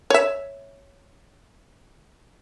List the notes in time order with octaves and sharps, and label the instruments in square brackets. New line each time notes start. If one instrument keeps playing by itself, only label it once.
[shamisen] C#5 E5